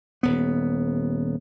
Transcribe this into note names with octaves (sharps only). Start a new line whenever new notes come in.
D#1 B3